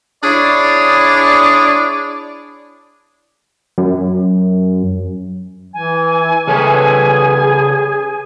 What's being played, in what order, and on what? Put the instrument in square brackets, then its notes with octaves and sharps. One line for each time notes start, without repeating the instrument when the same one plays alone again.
[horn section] D4 E4 G#4 C#5 D5
[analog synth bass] F#2
[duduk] E3 [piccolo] G#5
[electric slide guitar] C#3 A4 B4 [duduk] G#4